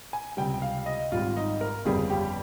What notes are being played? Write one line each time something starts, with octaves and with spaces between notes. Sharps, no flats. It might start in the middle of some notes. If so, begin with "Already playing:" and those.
G#5
C#2 C3 G3 G5
G5
F5
D#5
G#1 G#2 G3 F4
D#4
A#4
G1 F2 C#3 G3 G#4
G4